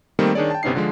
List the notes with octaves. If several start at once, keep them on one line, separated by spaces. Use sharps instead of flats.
D#3 G3 A3 A#3 C4
D#3 D4 G#4 C#5 D5
G5 A5
G1 C3 B3 C#4 D#4 C7
D3 F3 G#3